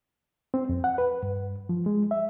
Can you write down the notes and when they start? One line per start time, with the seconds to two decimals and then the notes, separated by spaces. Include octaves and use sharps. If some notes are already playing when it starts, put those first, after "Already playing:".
0.54 C4
0.69 F2
0.84 F#5
0.98 B4
1.23 G2
1.69 F3
1.86 G#3
2.11 E5